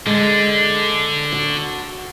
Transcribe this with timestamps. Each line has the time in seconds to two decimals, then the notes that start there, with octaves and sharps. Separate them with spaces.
0.06 D3 G#3
1.32 F#4